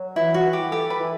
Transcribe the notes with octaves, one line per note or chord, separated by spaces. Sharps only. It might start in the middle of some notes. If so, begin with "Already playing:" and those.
Already playing: F#3
E3 E4
F#4
E3
G4
G4 A4
B4
E3